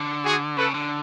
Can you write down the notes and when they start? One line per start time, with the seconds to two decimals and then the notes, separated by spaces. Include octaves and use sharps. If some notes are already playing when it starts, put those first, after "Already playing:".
Already playing: D3
0.25 F#4 G#4
0.57 C#3 A4 B4
0.74 D3